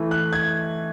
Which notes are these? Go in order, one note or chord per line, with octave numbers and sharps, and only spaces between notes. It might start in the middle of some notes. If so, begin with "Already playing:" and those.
Already playing: E3 A3 E4
F#6
G#6